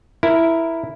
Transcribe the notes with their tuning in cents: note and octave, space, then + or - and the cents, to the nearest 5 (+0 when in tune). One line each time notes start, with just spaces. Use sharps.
E4 +0 A#4 -5